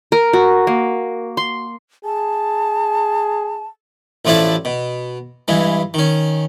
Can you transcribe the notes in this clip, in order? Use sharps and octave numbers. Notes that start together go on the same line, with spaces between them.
A#4
F#4
A#3
C6
G#4 A5
A1 F3 A3 D4 E4 A5
B2
G2 E3 G#3
D#3 C#4